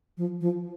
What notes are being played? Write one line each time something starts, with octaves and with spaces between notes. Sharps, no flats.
F3
F3